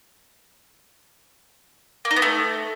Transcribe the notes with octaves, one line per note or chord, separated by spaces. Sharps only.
A#3
D#4
B3
A3